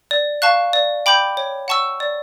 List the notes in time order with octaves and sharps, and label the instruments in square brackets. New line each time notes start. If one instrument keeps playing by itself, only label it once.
[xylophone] D5
F5 A5 C#6 F#6
D5
G5 B5 D6 G6
C#5
F#5 A5 C#6 E6
D5